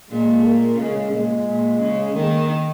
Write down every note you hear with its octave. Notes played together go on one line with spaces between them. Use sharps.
A#2 G#3
A#3
C#3 G#3
A#2 G#3
A#2
C#3
D#3 A#3